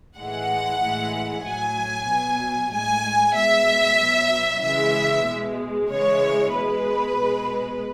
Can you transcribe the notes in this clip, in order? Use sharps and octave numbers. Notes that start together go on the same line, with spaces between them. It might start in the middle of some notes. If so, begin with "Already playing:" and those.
A2 E3 G#3 F#5
A2 E3 G#3
A2 F#3 G#5
B2 F#3
A2 G#3 G#5
B2 G#3 E5
B2 F#3
C#3 E3 G#3 E5
B2 G#3
C#3 E3 G#3 C#5
B2 G#3 B4
B2 G#3